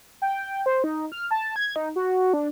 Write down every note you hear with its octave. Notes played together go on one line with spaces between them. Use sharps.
G5
C5
D#4
F6
A5
G#6
D#4
F#4
D4